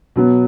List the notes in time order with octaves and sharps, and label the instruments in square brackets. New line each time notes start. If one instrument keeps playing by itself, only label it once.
[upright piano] B2 F#3 B3